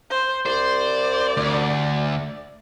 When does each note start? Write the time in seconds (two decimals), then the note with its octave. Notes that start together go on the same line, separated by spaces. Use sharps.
0.10 C5
0.46 C2 C5 D5
1.37 D2